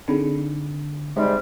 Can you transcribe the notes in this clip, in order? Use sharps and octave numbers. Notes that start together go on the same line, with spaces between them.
D3 C4 D#4 G#4
G#2 C3 G3 G#3 D#4